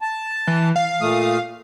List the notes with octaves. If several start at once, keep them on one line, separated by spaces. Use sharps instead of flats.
A5
E3
F5
A#2 A3 D#6